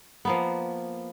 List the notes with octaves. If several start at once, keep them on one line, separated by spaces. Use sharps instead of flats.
F3 A#3 B3